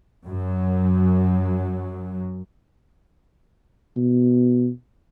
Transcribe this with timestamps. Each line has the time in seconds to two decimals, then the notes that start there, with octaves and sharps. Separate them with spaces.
0.25 F#2 F#3
3.97 B2